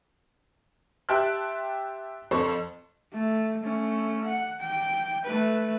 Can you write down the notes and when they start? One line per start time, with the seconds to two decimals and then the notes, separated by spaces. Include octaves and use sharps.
1.09 G4 E5 G5 A5 C6 F#6
2.31 F2 A4 C5 C#6
3.13 A3
3.63 A3 C#4
4.25 F#5
4.60 G5
5.25 A3 B4